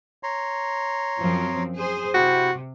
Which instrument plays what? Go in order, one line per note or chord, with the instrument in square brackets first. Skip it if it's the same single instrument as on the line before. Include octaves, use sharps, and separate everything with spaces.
[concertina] C#5 A#5 C6
[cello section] F#2 F3 C4
G#4 C5
[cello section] C3 [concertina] E4 G4 C5 [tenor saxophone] F#4